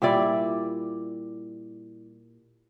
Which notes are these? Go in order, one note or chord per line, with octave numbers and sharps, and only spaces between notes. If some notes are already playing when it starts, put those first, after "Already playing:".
A#2 G3 E4 D5